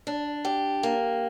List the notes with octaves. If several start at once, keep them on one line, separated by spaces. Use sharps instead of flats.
D4
G4
A#3